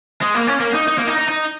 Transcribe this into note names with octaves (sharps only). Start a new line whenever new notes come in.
G#3
A#3
C#4
A#3
D#4
D#4
A#3
D#4
D#4
D#4